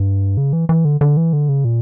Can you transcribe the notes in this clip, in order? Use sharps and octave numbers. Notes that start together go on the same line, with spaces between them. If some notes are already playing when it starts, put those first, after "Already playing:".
Already playing: G2
C#3
E3
E3
D3
D3
E3
D3
C#3
A#2